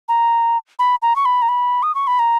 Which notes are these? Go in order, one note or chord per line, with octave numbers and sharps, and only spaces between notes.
A#5
B5
A#5
C#6
B5
A#5
B5
D#6
C#6
B5
A#5